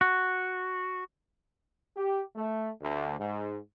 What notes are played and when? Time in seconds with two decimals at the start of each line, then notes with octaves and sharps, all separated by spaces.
0.01 F#4
1.97 G4
2.35 A3
2.81 D2
3.19 G#2